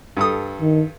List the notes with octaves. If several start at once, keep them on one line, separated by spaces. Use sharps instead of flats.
G2 A4 D#6
D#3